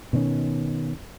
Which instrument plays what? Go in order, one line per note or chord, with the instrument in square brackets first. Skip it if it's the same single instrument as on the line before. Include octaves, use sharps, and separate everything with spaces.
[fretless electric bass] B2 D#3 C4 C#4